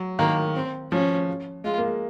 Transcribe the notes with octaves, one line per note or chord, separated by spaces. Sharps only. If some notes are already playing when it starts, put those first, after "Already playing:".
Already playing: F#3
D#3 A#3
C4
F3 C#4
G#3 F4
A#3
G#3